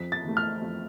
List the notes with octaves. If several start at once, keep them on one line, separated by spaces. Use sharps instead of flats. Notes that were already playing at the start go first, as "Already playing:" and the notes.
Already playing: F2 B6
A6
E3 A3
F6
F2